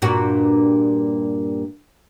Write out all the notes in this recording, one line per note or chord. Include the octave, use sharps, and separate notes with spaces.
G2 A#2 F#4